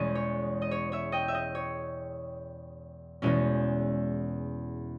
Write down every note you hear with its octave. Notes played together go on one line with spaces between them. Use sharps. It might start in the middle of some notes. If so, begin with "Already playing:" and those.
Already playing: E2 B2 G#3 C#4 D#5
C#5
D#5
C#5
C#5 E5
D#5 G5
E5
D#5
C#5
E2 B2 G#3 C#4 E4